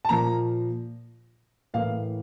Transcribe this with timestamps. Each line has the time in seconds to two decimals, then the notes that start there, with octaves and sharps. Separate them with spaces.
0.05 A5
0.09 A#2 F3 A#3 A#5
1.74 A2 E3 A#3 F5